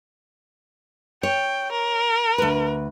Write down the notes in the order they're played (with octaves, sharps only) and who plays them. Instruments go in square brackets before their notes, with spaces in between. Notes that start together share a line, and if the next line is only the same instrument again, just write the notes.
[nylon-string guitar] C#5 [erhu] G5
[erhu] A#4
[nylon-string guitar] D2 B4